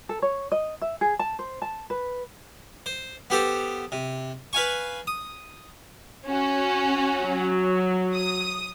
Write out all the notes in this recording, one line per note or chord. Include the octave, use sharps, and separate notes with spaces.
A4
C#5
D#5
E5
G#4
A5
C5
A5
B4
C5
B3 G4 A4 C5
C3
B4 F5 G#5 C#6
D#6
C#4 F#4
F#3
D#6